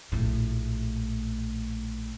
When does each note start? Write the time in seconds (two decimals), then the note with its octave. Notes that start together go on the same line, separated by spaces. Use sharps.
0.12 A#1 A2